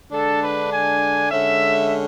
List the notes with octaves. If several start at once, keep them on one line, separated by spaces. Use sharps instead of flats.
D3 G#3 D4 A4
B4
G#5
D3 G#3 C#4 E5